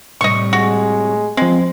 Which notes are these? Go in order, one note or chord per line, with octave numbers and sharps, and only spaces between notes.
A2 C3 G3 D#5 C#6
G#3 F#4
F3 G#3 C4